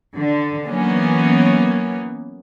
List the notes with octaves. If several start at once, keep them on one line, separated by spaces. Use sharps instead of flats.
D3
E3 F#3 A#3 B3 C#4